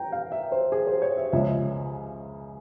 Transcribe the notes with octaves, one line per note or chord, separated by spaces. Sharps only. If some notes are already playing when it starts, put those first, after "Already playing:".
Already playing: G5 A#5
F5
E5
C5
G#4
C5
C#5
E5
C#2 C#3 F3 G#3 E5